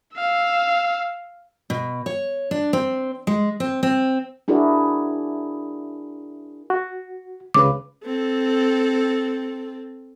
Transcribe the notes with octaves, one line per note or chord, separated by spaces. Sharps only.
F5 E6
B2
C#5
D4
C4
G#3
C4
C4
D4 E4 F#4 G#4 A#4 D5
F#4
C#2 C#3 B4 D6
C4 A4